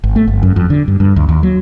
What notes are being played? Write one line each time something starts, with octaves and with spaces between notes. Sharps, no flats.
G#1
A3
G1
F#2
F2
D3
G2
G2
D2
D#2
F#3